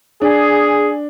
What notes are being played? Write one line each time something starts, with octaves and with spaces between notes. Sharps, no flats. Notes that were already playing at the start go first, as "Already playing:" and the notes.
D4 G#4